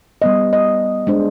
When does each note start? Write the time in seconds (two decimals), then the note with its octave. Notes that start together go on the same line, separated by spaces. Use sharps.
0.22 G3 B3 D#5
0.53 D#5
1.07 G#3 D4 C5